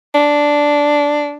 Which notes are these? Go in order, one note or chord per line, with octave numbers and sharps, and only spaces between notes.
D4